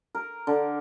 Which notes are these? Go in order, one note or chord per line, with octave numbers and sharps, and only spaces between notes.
A#4
D3